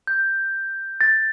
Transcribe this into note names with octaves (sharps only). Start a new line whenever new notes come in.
G6
A6